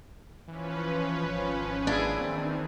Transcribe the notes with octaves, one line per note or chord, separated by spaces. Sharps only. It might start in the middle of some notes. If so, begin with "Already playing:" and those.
E3 F3 C#4 B4
G#1
A#3 D4 E4 G#4
D#3 E3 C4